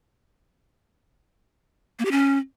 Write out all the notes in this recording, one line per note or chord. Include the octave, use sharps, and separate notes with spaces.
A#3
G4
C#4